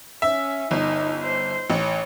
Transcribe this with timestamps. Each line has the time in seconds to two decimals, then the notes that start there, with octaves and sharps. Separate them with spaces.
0.22 C#4 E5
0.71 G1 D#4
1.22 C5
1.70 A1 C#5